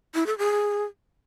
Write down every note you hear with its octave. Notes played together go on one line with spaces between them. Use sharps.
E4
A4
G#4